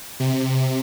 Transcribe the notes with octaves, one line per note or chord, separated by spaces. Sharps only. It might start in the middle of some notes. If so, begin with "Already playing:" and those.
C3